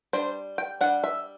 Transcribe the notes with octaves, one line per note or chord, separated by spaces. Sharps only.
G3 D4 C5
G5
G3 D4 F#5
E5